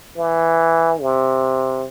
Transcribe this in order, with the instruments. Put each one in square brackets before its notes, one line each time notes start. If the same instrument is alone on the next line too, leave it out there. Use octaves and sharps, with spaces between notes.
[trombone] E3
C3